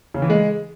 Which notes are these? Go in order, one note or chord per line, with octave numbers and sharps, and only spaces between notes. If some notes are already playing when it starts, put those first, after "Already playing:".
C#3
E3
G#3